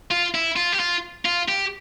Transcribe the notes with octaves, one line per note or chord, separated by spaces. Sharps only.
F4
E4
F4
G4
F4
F4
G4